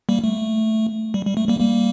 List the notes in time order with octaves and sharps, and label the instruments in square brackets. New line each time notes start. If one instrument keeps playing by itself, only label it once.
[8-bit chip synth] G3 A#3
A3
G3
G3
A3
G3 A#3
G3 A#3